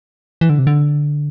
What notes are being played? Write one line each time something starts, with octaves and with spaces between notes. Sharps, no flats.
E3
D3
C3
D3